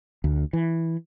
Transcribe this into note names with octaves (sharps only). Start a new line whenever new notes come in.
D2
E3